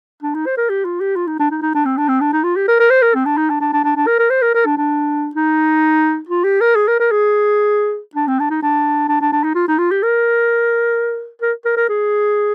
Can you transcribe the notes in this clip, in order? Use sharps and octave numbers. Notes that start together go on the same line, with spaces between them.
D4
D#4
C5
A#4
G4
F4
G4
F4
D#4
D4
D#4
D#4
D4
C4
D4
C4
D4
D#4
F4
G4
A#4
A#4
C5
A#4
C4
D4
D#4
D4
D4
D4
D4
D4
A#4
A#4
C5
A#4
A#4
D4
D4
D#4
F4
G4
A#4
G#4
A#4
A#4
G#4
D4
C4
D4
D#4
D4
D4
D4
D4
D#4
F4
D#4
F4
G4
A#4
A#4
A#4
A#4
G#4